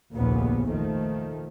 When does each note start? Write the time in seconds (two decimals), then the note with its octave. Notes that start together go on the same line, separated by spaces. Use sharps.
0.15 F1 A#1 D#2 A#2 C#3 B3
0.69 D#3 F3 A3